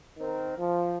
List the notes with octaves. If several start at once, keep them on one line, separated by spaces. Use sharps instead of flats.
D#3 C4 A#4
F3